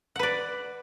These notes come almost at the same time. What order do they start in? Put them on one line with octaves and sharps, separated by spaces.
F#5 B4 D5